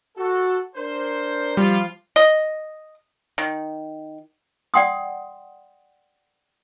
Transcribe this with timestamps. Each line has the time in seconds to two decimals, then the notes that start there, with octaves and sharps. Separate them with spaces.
0.17 F#4 A4
0.76 D4 A#4 C5
1.57 F3 G3 F4
2.16 D#5
3.38 D#3
4.74 D5 F#5 G5 C6 D#6